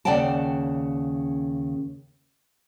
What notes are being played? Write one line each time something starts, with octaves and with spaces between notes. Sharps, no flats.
D#2 C#3 D5 F#5 G5 A5